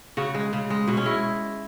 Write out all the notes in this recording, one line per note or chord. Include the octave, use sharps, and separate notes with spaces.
C#3 F#4
G#3
C#3
G#3
B2 F#4
C#4
G#3 E4